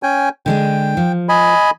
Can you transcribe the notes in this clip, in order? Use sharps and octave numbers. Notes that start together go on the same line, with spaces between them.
C#4 G5 G#5
D3 G#3 D4 G5
F3
D#5 G#5 B5